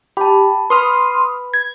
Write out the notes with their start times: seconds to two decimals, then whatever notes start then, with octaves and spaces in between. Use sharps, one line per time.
0.17 G4 A5 B5
0.70 B4 B5 C6 D#6 F6
1.54 G#6